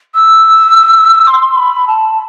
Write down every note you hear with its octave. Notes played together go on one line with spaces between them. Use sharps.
E6
C6
B5
A5